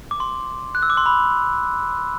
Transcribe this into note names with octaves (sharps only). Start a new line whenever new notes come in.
D6
C6
F#6
E6
D6
C6
B5